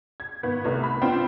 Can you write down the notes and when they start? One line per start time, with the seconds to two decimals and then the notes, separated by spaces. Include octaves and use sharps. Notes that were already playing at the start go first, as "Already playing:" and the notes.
0.20 G#6
0.43 G#1 B3 B4
0.64 C2 C3 A3 B4
0.84 B5
1.01 B3 C4 D4 F4